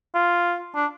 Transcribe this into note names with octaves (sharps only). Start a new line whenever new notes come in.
F4
D4